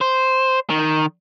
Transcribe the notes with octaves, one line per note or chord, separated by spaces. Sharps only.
C5
D#3